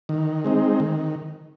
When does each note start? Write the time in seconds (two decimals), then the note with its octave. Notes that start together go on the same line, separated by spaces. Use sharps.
0.09 D#3
0.45 G#3 C4 D#4
0.80 D#3